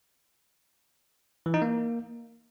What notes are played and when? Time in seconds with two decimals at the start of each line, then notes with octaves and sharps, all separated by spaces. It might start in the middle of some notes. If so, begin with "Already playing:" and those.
1.46 E3
1.54 D#4
1.62 A#3